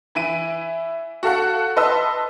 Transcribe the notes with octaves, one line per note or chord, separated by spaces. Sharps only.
E3 E4 D7 D#7
F#4 A4 F5 F#5
B4 D#5 A5 C6 E6